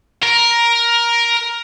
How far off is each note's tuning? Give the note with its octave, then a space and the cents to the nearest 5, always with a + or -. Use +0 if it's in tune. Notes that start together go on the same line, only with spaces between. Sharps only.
A#4 +10